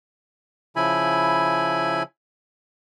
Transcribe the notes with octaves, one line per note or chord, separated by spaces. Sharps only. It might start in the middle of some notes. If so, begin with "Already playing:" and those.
C#3 F3 E4 G#5 B5